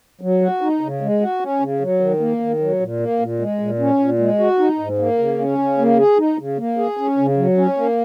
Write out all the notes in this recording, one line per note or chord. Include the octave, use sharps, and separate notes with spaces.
F#3
F#4
D#4
C#3
G#3
F#4
C#4
C#3
F#3
D#3
A#3
D#3
F#3
A#2
A#3
A#2
G#3
A#2
C#4
A#2
G#3
F#4
D#4
G#2
A#3
C#3
C#4
C#3
A#3
G#4
D#4
C#3
A#3
G#4
C#4
C#3
F#3
C#4
A#3